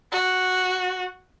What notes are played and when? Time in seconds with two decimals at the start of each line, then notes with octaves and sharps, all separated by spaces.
0.12 F#4